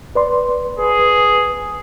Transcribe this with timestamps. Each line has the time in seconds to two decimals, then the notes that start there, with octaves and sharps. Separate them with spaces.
0.15 B4 D5 C6
0.79 G#4 B4